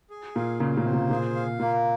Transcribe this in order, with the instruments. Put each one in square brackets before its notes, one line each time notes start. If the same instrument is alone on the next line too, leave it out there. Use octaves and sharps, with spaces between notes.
[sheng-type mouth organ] G#4
[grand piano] A#2 [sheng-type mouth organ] F5
[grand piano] A#2 C#3 [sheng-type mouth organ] A#3
[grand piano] A#2 C#3
[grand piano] C3 [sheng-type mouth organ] C5
[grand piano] A#2 C#3
[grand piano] A#2 [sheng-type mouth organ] G#4
[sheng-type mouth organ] F5
[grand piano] A#2 [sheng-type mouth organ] A#3